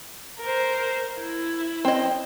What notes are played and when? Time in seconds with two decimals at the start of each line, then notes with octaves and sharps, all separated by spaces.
0.39 A#4 C5
1.19 E4
1.85 C4 D#5